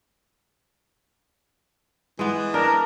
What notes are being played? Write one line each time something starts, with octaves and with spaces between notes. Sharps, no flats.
E3 G#3 B3
D4 A#4